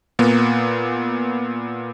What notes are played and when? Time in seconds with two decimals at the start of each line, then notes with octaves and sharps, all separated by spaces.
0.19 A#2 A#3 B3